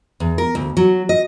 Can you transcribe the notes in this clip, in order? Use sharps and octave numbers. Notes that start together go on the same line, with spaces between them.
E2
A#4
D2
F#3
D#5